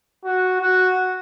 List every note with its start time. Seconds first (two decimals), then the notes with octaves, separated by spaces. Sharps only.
0.25 F#4
0.61 F#4